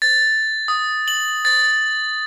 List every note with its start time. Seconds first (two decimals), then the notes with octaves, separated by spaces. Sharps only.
0.02 A6
0.68 D#6
1.08 F#7
1.45 A6